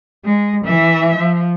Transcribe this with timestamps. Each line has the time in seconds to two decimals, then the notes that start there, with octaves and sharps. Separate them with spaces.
0.25 G#3
0.65 E3 E5
1.17 F3